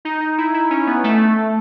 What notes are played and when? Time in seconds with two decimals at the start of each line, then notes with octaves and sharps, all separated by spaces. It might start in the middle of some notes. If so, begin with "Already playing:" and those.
0.05 D#4
0.21 D#4
0.38 E4
0.54 E4
0.70 C#4
0.87 B3
1.04 A3